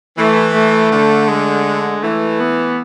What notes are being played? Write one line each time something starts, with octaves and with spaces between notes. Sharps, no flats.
E3 A3
A3
D3
G#3
E3 A3
B3